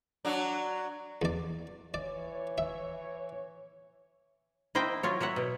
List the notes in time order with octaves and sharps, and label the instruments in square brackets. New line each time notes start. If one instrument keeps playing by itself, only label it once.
[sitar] F#3 D4
[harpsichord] E2 D5
[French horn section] E3 C#5 [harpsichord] D5
[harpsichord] E5
[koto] A#3 E4 C5 D#5 G5
F#3 F4 C#5
A#3 C#5 E5 F#5
B2